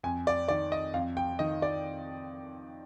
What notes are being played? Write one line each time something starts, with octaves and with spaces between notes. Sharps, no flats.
F2 G#5
D5
D#3 D5
D#5
F2 F5
G5
D#3 D#5
D5